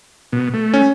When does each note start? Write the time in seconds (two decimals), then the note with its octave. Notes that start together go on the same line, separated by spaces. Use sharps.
0.32 B2
0.54 A3
0.74 C#4